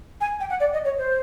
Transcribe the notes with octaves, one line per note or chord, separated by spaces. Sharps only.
G#5
G5
F#5
D5
D#5
C#5
C5